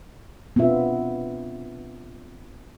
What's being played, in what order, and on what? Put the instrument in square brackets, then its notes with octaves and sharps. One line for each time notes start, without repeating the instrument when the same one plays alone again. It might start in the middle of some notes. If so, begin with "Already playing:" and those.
[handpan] B3 C4 D4 F4 E5